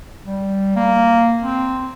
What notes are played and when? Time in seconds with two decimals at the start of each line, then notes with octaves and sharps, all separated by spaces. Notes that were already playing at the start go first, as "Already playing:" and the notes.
0.25 G3
0.76 A#3
1.42 C4